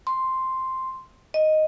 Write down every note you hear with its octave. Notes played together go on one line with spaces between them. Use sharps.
C6
D#5